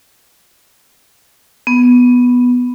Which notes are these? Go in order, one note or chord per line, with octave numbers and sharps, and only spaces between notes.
B3